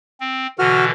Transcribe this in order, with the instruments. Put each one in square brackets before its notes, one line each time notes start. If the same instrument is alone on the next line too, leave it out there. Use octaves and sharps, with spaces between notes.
[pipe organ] C4
[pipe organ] B2 D3 E3 [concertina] F#4 F6